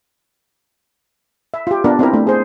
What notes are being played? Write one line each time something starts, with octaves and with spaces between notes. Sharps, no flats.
E5
F4 G4
B3 D4 F4 A#4
C4 E4 A#4
A3 D4
G#4 C5